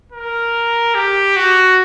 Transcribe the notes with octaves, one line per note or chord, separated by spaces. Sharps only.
A#4
G4
F#4